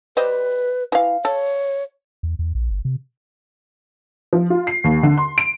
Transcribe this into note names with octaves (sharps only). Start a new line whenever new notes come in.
G3 B4 C5 D#5
E3 F5
A4 C#5
E2
E2
A#1
G1
C3
F3
F4
C7
D#2
D3
C6
D7